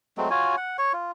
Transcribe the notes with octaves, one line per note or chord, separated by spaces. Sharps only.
F#3 G#3 A3 C4
F4 F#4 C#5 G#5
F#5
C#5 C#6
F4